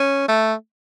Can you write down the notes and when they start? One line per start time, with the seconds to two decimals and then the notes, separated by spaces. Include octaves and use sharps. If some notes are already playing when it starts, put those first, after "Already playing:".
Already playing: C#4
0.28 A3